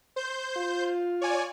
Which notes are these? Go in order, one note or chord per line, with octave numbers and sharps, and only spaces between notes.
C5 G6
F4
C#5 D5 G#5